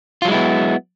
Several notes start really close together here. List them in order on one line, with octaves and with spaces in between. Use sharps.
F4 F#3 G#3 E4 B3